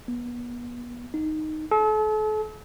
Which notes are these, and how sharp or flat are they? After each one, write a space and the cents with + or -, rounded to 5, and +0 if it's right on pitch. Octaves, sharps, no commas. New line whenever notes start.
B3 -35
D#4 -5
A4 -40